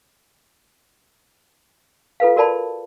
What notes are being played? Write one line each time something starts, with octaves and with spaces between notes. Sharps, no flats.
F4 A4 B4 F5
F#4 A#4 D5 A5 B5